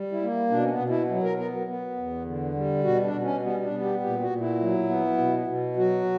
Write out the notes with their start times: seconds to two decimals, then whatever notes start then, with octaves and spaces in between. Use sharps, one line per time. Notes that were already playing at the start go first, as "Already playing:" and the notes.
Already playing: G3
0.12 E4
0.22 A#3
0.50 B2 D4
0.65 C#4
0.70 B3
0.79 B2
0.89 E4
1.09 F#3
1.23 A#4
1.37 B3 A#4
1.67 B3
1.96 E2
2.25 D3
2.54 G3
2.84 B2 F#4
3.03 D4
3.13 B2
3.23 C#4
3.42 G3 B3
3.62 D4
3.72 B3
3.81 G4
4.01 A#2 G4
4.20 F#4
4.30 A#2
4.40 E4
4.59 F#3
4.89 B3
5.18 B2
5.47 B2
5.76 F#3 F#4